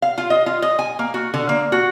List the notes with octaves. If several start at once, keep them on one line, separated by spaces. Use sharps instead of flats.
F5
F4
D#5
F4
D#5
G#5
A#3
F#4
D3
A#3
F#4